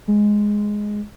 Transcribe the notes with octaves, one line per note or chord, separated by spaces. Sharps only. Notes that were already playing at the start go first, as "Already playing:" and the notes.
G#3